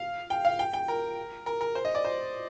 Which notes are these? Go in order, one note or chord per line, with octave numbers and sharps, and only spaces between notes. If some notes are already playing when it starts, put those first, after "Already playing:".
Already playing: F5
G5
F5
G5
G5
A#4
A#4
A#4
C5
D#5
D5
C5